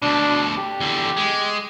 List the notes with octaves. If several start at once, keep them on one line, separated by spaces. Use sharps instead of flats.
D2 B2 D4
G4
E2 D3
G#3